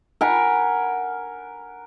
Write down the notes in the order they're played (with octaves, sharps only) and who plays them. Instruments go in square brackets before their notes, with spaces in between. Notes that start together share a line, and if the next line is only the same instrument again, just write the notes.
[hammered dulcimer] A#4 F#5 G#5 B5